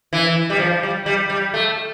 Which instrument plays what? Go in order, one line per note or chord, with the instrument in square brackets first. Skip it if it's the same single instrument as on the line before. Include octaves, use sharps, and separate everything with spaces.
[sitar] E3
G3
F3
G3
G3
G3
A3